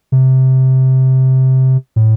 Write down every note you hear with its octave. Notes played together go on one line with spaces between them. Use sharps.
C3
A2